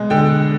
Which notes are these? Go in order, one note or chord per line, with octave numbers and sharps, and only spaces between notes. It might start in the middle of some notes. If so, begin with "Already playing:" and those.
Already playing: B2 G#3
D3 G5